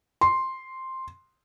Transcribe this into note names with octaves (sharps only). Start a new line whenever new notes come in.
C6